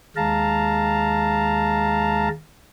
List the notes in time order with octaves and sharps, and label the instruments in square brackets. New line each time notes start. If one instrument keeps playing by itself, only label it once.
[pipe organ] D#2 G#3 F5 A5 A#5